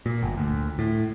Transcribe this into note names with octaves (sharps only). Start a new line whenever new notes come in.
A#2
G1
D2
A2